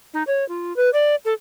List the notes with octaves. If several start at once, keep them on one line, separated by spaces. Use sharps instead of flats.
D#4
C#5
F4
B4
D5
A4